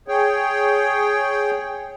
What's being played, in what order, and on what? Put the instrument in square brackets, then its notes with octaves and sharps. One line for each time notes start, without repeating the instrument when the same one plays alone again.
[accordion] G#4 C#5 G5